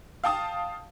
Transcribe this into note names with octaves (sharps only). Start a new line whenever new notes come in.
F5 G5 A5 D#6